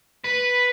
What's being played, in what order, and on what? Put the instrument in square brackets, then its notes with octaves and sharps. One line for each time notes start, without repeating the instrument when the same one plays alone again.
[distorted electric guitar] B4